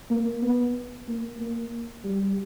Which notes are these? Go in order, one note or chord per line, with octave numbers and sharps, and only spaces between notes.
A#3
B3
A#3
A#3
G3